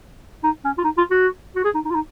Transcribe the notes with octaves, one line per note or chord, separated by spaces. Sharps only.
D#4
C#4
F4
D#4
F4
F#4
F#4
G#4
D#4
D#4
F4
D#4